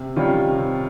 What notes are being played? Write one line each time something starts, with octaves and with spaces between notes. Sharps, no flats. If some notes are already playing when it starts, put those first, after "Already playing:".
Already playing: C3
D#3 G3 C#4 F4
C3